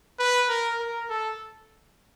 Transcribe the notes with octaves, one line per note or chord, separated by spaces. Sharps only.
B4
A#4
A#4
A4